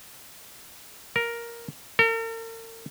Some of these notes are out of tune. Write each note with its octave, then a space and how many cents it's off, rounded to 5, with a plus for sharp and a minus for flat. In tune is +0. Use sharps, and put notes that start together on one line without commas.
A#4 +5
A#4 -45